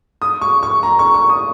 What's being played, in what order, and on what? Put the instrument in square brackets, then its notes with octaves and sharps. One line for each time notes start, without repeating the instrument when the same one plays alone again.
[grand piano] D#6
C#6
C#6
A#5
C#6
C#6
D#6